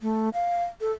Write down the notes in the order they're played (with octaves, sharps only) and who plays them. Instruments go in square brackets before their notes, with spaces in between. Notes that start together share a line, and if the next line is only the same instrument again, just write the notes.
[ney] A3
F5
A4